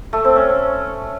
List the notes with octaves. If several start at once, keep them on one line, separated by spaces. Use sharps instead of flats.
A3
C4
C#4